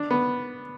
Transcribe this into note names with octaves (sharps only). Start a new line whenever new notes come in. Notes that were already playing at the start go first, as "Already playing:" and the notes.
Already playing: D4
B3